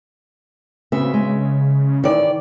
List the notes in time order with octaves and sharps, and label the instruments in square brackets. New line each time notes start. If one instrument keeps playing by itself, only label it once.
[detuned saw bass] C#3 [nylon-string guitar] B3 C4 F#4 [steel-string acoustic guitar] E5
[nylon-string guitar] G#3
[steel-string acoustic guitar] D#3 D5 [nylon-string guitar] E3 E5